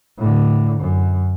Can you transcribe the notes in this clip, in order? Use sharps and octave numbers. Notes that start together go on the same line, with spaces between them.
A2 D3
F#2